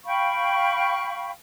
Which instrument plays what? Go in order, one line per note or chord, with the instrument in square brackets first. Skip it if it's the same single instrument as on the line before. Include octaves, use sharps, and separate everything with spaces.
[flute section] F5 G5 B5 C#6